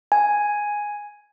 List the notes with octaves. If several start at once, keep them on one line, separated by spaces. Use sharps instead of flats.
G#5